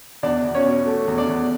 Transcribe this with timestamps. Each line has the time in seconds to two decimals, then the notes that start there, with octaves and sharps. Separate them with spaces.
0.23 E2 D4 D5
0.44 E2
0.55 C#4 C#5
0.65 B2
0.86 A3
1.08 E2
1.18 D4 D5
1.29 E2